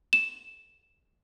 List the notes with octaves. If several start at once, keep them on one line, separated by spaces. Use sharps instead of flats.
E7